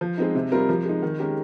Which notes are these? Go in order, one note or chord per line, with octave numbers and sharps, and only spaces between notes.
F3
G#3 C4 D#4
C3
G3 C4 F4 A#4
F3
G#3 D#4
D#3
G#3 C#4 G4 A#4